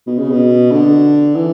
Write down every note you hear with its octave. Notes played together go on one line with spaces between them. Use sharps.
B2
C#3
B2
D3
E3